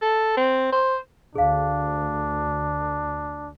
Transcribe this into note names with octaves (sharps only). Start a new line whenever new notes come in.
A4
C4
C5
D2 D4 G#4 F5